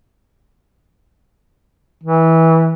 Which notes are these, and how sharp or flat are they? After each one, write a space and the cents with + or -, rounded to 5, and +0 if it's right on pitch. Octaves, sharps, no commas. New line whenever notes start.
E3 -20